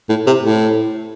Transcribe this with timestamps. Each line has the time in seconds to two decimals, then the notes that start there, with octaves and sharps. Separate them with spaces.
0.09 A2
0.26 C3
0.42 A2